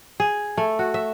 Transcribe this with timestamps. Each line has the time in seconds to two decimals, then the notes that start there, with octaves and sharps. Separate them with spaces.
0.20 G#4
0.57 A3
0.79 F#4
0.94 E5